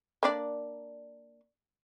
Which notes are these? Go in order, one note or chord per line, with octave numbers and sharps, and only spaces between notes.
A#3 D4 D5